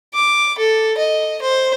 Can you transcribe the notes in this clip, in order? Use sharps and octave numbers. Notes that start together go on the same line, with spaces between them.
D6
A4
D#5
C5